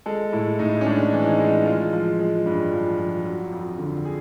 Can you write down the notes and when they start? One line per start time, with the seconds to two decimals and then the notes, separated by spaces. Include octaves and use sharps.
0.06 G#3 A4
0.33 A2 E4
0.59 A2 D#4
0.81 C#4
0.86 G#3 D4
1.13 E3
1.26 D#4
1.39 G#3
1.66 G#3 F4
1.93 F3
2.19 G#3
2.46 G2
2.72 F3
2.98 F3
3.25 F#3
3.52 F2
3.78 D3
4.05 G#4